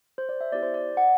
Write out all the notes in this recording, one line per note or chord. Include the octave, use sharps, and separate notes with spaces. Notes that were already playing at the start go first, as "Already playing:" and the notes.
C5
D5
E5
B3 E4 G4 D5
C5
D5
F#5